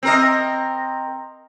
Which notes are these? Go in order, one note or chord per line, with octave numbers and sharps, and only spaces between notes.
C4 A#4 D#5